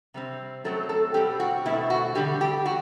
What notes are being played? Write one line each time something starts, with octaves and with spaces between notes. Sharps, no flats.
C3 G3 C4
F#2 F#3 A3 C4 A4
A4
B2 G3 C4 G4
F#4
B2 A3 C4 E4
F#4
E2 D3 G3 G4
G4
F#4